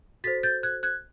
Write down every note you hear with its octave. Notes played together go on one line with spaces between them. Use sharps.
F#4 A4 C5 A6 B6
G6 A6
F#6 G#6
F#6 G#6